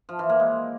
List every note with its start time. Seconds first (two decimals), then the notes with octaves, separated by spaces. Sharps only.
0.09 F3
0.19 E3
0.29 A#3
0.40 G#3